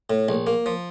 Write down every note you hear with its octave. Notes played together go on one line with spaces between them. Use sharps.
A2
A#1
A#3
F3